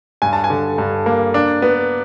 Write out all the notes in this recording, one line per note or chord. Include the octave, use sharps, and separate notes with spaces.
G2 G#5
A5
G#5
D3
G2
A#3
D4
B3